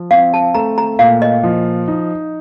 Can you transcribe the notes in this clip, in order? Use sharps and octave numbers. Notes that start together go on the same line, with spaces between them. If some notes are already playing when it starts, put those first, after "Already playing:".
Already playing: F3
C4 F5
A5
A3 A#5
A#5
A#2 F5
D#5
F3
D#4